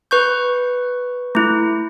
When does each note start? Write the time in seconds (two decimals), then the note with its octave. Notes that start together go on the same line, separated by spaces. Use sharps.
0.11 B4 C#6 G6
1.35 A3 E4